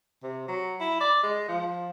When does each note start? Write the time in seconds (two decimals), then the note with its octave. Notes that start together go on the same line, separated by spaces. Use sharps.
0.23 C3
0.48 F#3
0.80 E4
1.01 D5
1.23 G#3
1.48 F3